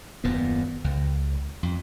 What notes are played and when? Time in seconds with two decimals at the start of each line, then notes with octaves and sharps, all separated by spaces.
0.24 D#1 F#2 A#2 B3
0.84 C#2
1.63 F2